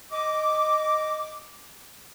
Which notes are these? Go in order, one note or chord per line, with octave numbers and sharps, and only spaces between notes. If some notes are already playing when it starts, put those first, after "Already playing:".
D#5 D6